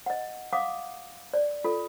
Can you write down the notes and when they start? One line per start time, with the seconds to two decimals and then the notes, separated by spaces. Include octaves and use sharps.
0.06 D#5 F#5
0.53 F5 F#5 D6 D#6
1.34 D5
1.64 F4 A4